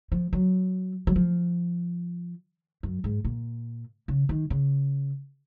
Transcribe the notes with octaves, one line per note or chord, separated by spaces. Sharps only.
F3
F#3
F#3
F3
F#2
G#2
A#2
C#3
D#3
C#3